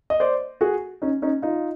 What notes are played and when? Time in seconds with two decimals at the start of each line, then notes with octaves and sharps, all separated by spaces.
0.10 D#5
0.20 C5 D5
0.61 F#4 G#4
1.02 C#4 D#4
1.22 C#4 D#4
1.42 D#4 F4